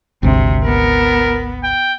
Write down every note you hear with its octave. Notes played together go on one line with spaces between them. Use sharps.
G#1 D2 C3
B3 A#4
G5